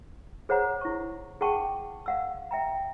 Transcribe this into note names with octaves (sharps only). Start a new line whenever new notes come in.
G#4 C5 C#5 F#5 A#5
E4 C#6
G#4 F#5 G5 A5 C#6
F5 F#5 E6
E5 G5 A#5